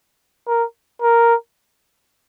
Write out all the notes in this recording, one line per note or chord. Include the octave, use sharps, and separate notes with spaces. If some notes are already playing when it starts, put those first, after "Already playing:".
A#4
A#4